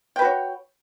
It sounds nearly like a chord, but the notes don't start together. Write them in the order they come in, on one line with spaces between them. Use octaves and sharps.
G5 B4 F#4 C#5